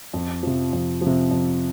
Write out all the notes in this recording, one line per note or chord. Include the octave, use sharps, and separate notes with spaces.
F2
C3 F3
F2
F3
C3
F2